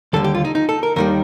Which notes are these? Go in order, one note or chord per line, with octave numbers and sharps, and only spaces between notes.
D#2 D3 G3 A4
G4
F4
D#4
D#4
A4
A#4
D#2 D#3 G3 A#4